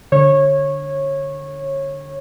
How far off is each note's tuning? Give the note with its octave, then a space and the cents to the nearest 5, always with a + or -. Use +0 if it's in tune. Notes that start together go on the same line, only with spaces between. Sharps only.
D3 +0 C#5 -20